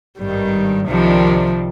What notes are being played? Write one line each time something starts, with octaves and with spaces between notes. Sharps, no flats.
G#1 G2 D#3 G3
C2 C3 D#3 F3 G3 D4